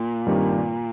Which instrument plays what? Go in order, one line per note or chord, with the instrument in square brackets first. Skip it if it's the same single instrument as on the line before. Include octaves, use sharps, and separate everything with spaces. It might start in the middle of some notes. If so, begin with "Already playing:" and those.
Already playing: [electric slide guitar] A#2
[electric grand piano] G2 D#3 G3 C4 G4